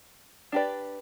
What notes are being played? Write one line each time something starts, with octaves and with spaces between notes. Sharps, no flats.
D4 G4 B4 D5